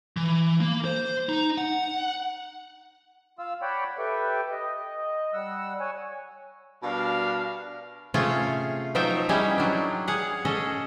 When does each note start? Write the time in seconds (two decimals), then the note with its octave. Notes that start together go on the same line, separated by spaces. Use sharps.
0.17 E3
0.61 A#3
0.85 C5
1.29 D#4
1.58 F#5
3.39 F4 F5 E6
3.62 C#5 D5 F#5 G5 B5
3.98 G4 A4 B4 E5 G5
4.52 D#5
5.33 G3 F#5 E6
5.80 C#5 F#5 G#5
6.83 B2 G3 D4 A#4 F5
8.14 C3 A3 C#4 F4 G#4
8.95 F3 F#3 D#4 F4 E5 G5
9.29 G3 C#4 D#4 E4 G4 G#4
9.58 F#3 D4
10.08 G#4 F5 F#5
10.45 C#4 G#4 A4 D#5